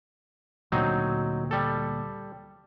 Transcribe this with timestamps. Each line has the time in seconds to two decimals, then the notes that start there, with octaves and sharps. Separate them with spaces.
0.72 D2 A#2 D3 F#3 C4 D#4
1.51 G3 A4